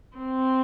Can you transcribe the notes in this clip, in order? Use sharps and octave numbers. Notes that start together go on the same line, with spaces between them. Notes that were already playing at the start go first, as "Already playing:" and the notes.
C4